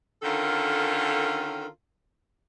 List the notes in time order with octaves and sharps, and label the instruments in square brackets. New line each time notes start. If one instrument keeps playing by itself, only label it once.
[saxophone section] D3 D#3 C#4 F4 A4 A#4